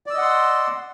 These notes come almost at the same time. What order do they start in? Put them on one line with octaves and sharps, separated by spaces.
D5 E6 D#5 F#5 C6